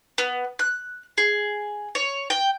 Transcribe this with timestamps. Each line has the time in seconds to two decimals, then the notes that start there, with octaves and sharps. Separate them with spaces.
0.18 B3
0.59 F#6
1.18 G#4
1.95 C#5
2.30 G5